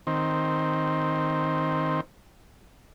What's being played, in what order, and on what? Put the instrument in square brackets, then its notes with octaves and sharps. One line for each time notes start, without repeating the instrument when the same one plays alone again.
[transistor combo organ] D#3 C4